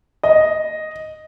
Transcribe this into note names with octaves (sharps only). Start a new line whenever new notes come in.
D#5